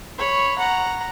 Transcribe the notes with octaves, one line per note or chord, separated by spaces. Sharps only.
C#5 B5
F#5 A#5